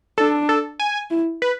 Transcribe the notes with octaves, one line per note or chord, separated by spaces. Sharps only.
D4 A4
A4
G#5
E4
B4